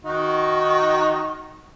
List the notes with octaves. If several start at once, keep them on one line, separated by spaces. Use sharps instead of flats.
D#3 D#4 F#4